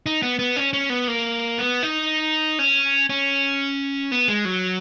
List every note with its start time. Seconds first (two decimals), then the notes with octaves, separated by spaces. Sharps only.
0.06 D#4
0.22 B3
0.39 B3
0.57 C#4
0.73 C#4
0.90 B3
1.08 A#3
1.58 B3
1.83 D#4
2.59 C#4
3.10 C#4
4.12 B3
4.28 G#3
4.45 F#3